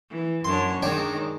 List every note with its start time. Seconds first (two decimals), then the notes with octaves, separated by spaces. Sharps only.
0.10 E3
0.44 F#2 D4 C#5 C6
0.83 D#3 G#3 D4 C#5 G5